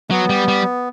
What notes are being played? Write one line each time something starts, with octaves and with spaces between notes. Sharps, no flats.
F#3 B3
G3
G3